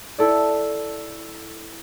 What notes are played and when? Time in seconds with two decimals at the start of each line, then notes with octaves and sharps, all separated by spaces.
0.18 E4 A4 D5